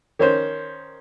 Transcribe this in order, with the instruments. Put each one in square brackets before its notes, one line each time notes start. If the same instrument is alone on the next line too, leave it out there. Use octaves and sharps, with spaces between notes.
[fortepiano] D#3 C#4 C5